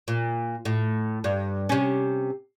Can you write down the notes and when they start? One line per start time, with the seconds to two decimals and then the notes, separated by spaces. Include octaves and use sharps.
0.08 A#2
0.65 A2
1.24 G2
1.69 C3 C#4